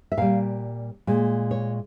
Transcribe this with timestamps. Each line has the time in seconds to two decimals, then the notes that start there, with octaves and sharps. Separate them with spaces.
0.12 E5
0.17 A#2 G3 F5
1.07 A#2 G#3
1.51 C#5